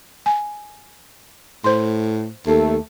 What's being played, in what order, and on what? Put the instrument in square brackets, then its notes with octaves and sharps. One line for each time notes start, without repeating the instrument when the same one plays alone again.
[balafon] G#5
[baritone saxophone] A2 [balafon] C5 C6
[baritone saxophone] D#2 [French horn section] A3